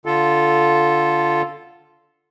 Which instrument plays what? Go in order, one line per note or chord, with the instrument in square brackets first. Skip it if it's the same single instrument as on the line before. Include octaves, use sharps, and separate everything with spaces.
[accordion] D3 F4 A4